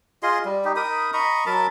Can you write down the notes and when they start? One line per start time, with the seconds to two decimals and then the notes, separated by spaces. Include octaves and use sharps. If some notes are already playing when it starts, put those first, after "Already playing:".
0.23 F4 G#4 D#5 C6
0.45 G3
0.65 D#4 G4
0.76 D#4 A#4 B5 D#6
1.13 D#5 A#5 B5 C#6
1.46 F#3 A#4 A5 B5